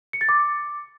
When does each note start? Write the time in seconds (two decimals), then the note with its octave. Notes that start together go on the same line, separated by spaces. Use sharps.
0.13 C#7
0.21 A6
0.29 D6